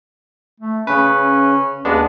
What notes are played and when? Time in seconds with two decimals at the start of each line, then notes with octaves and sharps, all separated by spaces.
0.60 A3
0.87 C#3 C#4 B4
1.85 D#2 G#3 B3 D4